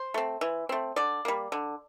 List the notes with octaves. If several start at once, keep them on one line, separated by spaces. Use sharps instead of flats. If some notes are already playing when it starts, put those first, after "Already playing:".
Already playing: C5
A3 C4
E3
A3 C4
D3 D5
G3 A#3
D3